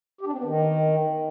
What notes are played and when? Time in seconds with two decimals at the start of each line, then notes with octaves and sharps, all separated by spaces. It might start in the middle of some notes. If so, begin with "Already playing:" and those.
0.21 G4
0.27 D4
0.33 C4
0.38 B3
0.44 D#3